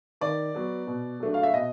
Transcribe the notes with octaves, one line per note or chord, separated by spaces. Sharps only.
D#3 D5
F#3 B3
B2
F#3 A3 D4
F5
E5
B2 D#5